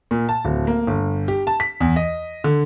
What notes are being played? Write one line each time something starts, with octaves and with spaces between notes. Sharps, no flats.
A#2
A5
D1
A#3
G1
G4
A5
B6
E2
D#5
D3